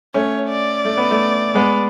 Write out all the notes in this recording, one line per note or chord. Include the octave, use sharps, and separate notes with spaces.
A3 C#4 C#5
D5
A3
B3
A3
G#3 B3